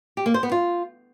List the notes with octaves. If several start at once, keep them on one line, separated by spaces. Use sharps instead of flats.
G4
A#3
C5
B3
F4